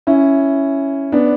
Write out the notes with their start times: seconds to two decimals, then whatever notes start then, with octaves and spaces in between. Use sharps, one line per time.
0.07 C#4 E4
1.12 B3 D4